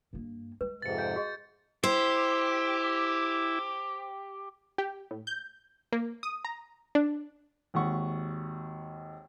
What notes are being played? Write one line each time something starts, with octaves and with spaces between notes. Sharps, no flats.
G2 A#3
G#3 B4
F2 G#2 C3 A6 C#7
F5 G#5 G6
F#4 G#4 D#5
E4 G4 C5
G4
A2
G6
A#3
D#6
A#5
D4
G#1 D#2 F#5 C#6